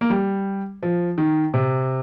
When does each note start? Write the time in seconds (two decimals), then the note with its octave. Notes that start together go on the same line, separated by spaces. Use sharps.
0.01 A#3
0.10 G3
0.83 F3
1.18 D#3
1.54 C3